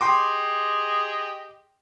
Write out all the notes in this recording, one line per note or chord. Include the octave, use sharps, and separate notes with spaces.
G4 G#4 D#5 G5 C6 D6